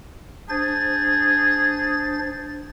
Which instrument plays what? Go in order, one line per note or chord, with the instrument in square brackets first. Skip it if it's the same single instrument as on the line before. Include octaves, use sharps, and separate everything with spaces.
[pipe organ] D4 C5 A6 [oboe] G#4